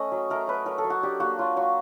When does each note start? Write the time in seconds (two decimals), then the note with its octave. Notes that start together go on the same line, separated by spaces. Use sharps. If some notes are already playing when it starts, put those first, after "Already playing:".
Already playing: A3 C#4 D#5
0.12 F#3
0.30 A3 A#4
0.48 F#3 B4
0.66 F#3 A#4
0.78 A4
0.84 F#3
0.90 F#4
1.03 D4 G4
1.20 A#3 F#4
1.38 F#3 F4
1.56 F#3 F#4